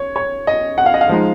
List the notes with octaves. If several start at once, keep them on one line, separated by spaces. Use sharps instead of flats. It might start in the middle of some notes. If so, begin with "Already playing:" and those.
Already playing: C#5
C#5
D#5
F#5
F5
D#5
F5
F3 G#3 D#4